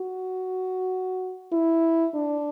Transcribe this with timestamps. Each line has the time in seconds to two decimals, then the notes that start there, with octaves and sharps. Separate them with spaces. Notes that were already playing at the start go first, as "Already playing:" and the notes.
Already playing: F#4
1.52 E4
2.14 D4